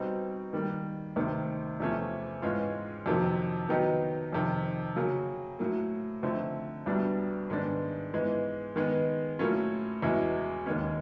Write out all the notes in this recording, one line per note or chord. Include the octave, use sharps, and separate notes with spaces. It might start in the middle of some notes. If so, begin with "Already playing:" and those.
Already playing: B2 G3 C4 D#4
D#3 G3 A#3
D2 C3 D#3
E2 C3 F3 A3 C#4
G#2 E3 G#3 C#4 F4
F2 C3 D#3 F#3 A#3
D#3 F#3 B3 D#4 G4
F2 C3 D#3
C#3 F#3 A#3
A2 F#3 A#3
D3 F3 A3 C4 D#4
C2 B2 G3 B3 D4
G#2 D#3 G#3 B3 D4
G#2 E3 G#3 B3
D#3 G#3 B3
A2 F#3 A#3 C#4 F4
E2 B2 G#3 C#4 E4
D#2 D#3 G#3 C#4